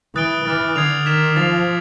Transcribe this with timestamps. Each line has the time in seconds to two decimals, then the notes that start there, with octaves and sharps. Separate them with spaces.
0.15 E3 D#6 F#6 A6 D7 G7
0.45 E3 D6 F6 A6
0.76 D3 D#6 G#6 C7 F7
1.06 D#3 F6 G#6 B6 E7
1.36 F3 A6 C7 F7